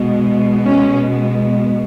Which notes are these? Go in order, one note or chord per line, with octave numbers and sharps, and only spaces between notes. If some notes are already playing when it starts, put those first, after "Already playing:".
Already playing: B2 G#3 B3
C#4